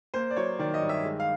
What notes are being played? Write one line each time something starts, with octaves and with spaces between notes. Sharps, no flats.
A#3 C5
D5
F#3 C#5
D#3 D5
D#5
G2
E5
G#3
F5